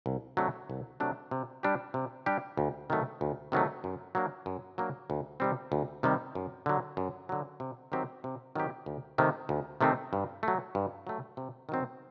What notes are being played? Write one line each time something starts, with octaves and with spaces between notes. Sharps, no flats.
C2
C3 F#3 A3 D4
C2
C3 F#3 A3 D4
C3
G3 D4 G4
C3
G3 D4 G4
D2
C3 D#3 F#3 A3
D2
C3 D#3 F#3 A3
F#2
F#3 A#3 D4
F#2
F#3 A#3 D4
D2
C3 D#3 G3 C4
D2
C3 D#3 G3 C4
F#2
D3 F#3
F#2
D3 F#3
C3
D#3 F#3 C4 G4
C3
D#3 F#3 C4 G4
D2
C3 D#3 A3 C4
D2
C3 D#3 A3 C4
G2
F#3 A3
G2
F#3 A3
C3
D#3 F#3 C4